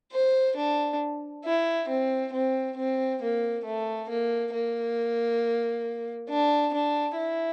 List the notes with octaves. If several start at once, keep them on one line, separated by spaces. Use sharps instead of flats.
C5
D4
E4
C4
C4
C4
A#3
A3
A#3
A#3
D4
D4
E4